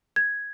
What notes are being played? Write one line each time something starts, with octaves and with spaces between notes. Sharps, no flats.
G#6